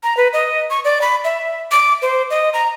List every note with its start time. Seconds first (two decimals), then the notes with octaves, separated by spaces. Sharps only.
0.03 A#5
0.17 B4
0.33 D#5
0.70 C#6
0.85 D5
1.02 B5
1.24 E5
1.71 D6
2.02 C5
2.30 D#5
2.54 A#5